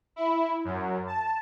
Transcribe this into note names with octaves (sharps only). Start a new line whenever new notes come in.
E4
F#2
A5